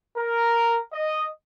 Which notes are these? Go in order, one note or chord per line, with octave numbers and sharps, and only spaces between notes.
A#4
D#5